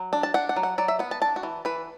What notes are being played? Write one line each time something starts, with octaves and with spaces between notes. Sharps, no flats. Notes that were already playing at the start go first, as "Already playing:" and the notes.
Already playing: F#3
D4
A5
D4 F#5
F#5
F#3
F#5
F#3 D5
E5
B3 F#5
A5
D4 A5
F#4
E3
E3 B4